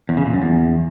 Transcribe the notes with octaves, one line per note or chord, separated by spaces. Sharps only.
E2
C#3
A#2
F#2
E2